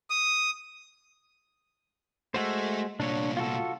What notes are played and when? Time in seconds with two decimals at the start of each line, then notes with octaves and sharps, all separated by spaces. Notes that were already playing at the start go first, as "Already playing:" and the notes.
0.10 D#6
2.34 G#3 A3 F#4 C5
3.00 C2 A#2 D4 C#5
3.37 F4 F#4 A4